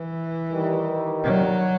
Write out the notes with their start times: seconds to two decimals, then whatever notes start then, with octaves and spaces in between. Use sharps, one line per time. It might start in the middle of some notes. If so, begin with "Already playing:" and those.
Already playing: E3
0.50 D#3 G3 D#4
1.23 F#3